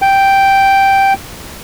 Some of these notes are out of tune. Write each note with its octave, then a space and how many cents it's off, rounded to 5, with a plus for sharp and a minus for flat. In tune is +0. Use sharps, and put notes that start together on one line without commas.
G5 -5